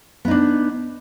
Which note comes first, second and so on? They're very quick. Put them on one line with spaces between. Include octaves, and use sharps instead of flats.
B3 D#4 D4